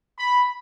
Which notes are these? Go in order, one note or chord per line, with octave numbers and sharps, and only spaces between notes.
B5